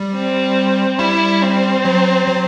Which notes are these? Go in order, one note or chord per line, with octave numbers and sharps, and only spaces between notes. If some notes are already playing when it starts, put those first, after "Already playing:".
Already playing: G3
C4
G3 E4
C4
F#3
F#3